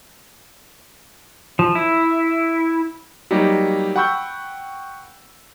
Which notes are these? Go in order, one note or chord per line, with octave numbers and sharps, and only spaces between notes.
F3
E4
F#3 G3 A#3 D#4 G4
F#5 G5 B5 C#6 E6 G6